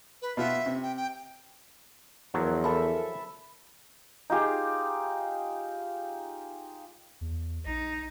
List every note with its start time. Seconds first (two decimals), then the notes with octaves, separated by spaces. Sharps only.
0.22 B4
0.37 B2 F4 E5 F#5
0.66 C3
0.82 G5
0.97 G5
2.34 E2 F3 F#3 A#4
2.64 E4 A4 E5
4.30 D#4 F4 G4 G#4
7.21 E2
7.66 A#1 D#4